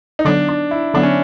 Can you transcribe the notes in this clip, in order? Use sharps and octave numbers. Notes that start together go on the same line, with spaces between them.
D#4
D3 F#3 B3 D4
D4
E4
D3 F#3 B3 D4
C#4